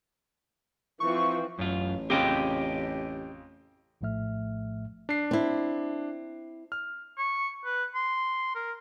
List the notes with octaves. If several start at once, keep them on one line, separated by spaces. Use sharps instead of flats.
E3 F3 C4 C#6
A1 F#2 F4
F2 C#3 G4 D#5 G5
A#1 A2 F3 A3 E5 F6
D4 C7
C4 E4
F6
C#6
B4
C6
A#4